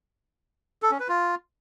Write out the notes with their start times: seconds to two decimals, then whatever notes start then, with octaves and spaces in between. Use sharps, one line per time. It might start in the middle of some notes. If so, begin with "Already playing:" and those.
0.83 A4
0.91 C#4
1.00 B4
1.09 F4